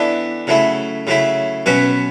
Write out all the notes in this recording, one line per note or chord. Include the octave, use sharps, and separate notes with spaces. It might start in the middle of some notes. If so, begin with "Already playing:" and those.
Already playing: E3 B3 D4 A4
C#3 F#3 A3 E4
C#3 F#3 A3 E4
B2 F#3 C#4 F#4 B4